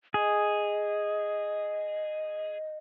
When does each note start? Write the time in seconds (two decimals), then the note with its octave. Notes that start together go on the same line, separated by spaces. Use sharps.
0.14 G#4 D#5